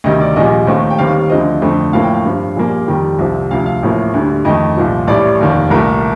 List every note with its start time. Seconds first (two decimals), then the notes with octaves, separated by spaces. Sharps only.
0.04 D2 C3 D#3 G3 D#5
0.20 D5
0.36 A#1 A#2 G3 D#5
0.67 D#2 D#3 A3 C4
0.90 G5
0.98 D#2 D#3 G3 C4 F5
1.30 D2 D3 F3 C4 D#5
1.62 F2 D3 A3 C4
1.93 A1 A2 F3 A#3 F5
2.03 G5
2.14 F5
2.25 G2 F3 C4
2.56 A#1 A#2 G3 A#3
2.88 F2 D#3 G3 G5
3.19 C2 C3 F3 C4
3.51 D2 C3 F3 F5
3.66 F5
3.83 A1 A2 F3 A#3
4.14 D2 D3 G3
4.45 F2 D#3 A3 D#5
4.77 C2 A#2 F3
5.07 A1 A2 G3 D5
5.40 F1 D#2 D#3
5.70 C2 A#2 A3 A#4